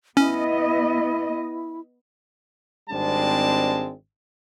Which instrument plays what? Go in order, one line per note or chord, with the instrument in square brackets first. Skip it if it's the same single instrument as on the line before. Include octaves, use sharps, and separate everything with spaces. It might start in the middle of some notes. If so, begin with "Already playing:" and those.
[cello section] B3 D#5 [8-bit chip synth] C#4 [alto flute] E4
[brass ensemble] G#1 G3 G#3 C4 D4 A5